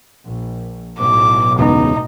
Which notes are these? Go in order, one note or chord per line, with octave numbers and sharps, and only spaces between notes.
A#1
B1 A2 D6
E1 C#2 B3 D#4